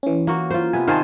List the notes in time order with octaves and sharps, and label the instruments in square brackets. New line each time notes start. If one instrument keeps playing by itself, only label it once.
[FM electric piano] E3 C#4
[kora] A#3 F#4
F4 C5
[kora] C3 B3 [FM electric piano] G#5
[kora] D#3 C5 [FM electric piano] F5 G#5 A5